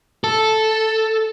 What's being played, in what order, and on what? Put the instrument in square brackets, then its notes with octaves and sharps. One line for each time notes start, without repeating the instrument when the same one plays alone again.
[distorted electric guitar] A4